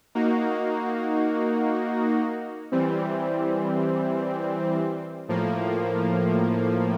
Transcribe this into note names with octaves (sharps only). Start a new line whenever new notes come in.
A#3 D#4 F#4
E3 G3 C4
A2 F3 A#3